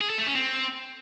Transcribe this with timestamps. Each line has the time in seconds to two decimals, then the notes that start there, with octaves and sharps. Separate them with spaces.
0.01 G#4
0.10 A4
0.18 A3
0.27 C#4
0.35 C4